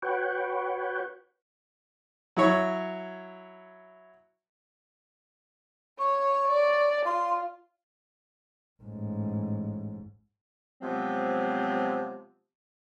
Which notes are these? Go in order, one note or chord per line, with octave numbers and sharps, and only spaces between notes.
F#4 B4 C#5 F#5 G5
F#3 E4 C#5
C#5 C#6
D5
F4 C6
A1 G#2
C3 F3 F#3 G#3 B3 C4